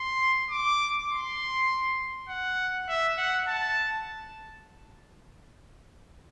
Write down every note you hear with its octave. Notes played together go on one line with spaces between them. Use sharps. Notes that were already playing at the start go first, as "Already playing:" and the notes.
Already playing: C6
D6
C6
F#5
E5
F#5
A5